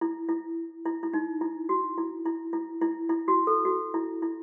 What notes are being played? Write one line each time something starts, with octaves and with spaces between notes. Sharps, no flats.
E4
E4
E4
E4
D#4
E4
F#4
E4
E4
E4
E4
E4
F#4
A4
F#4
E4
E4